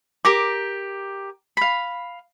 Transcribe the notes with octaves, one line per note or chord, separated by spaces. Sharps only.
G4 A#4 D6
F5 B5